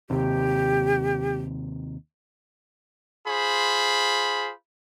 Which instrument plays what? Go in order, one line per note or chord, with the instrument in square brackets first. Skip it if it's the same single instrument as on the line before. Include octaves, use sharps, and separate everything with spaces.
[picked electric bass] D#2 C3 [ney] G4
[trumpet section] F4 G#4 C5 B5